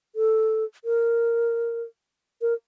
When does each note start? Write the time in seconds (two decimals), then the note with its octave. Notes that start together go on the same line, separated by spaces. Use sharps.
0.15 A4
0.85 A#4
2.42 A#4